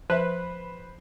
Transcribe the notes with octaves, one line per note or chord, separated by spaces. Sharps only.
F3 B4 C5 E5